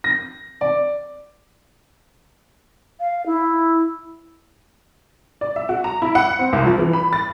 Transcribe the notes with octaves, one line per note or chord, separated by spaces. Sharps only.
A#6
D5
F5
E4
D5
E5
F#4
A#5
E4
F#5
C4
C2
F3
E3
B5
A6